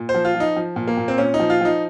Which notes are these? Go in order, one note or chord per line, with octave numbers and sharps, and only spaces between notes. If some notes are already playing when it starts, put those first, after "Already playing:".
Already playing: A#2
C5
F3
F4
F3
D#4
F3
A#2
A#3
A#2
C4
A#2 C#4
D#4
F3
F4
F3 D#4